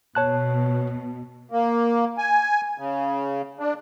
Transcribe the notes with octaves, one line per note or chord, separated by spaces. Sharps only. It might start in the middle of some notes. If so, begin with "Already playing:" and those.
B2 C#5 A5 F#6
A#3
G#5
C#3
D4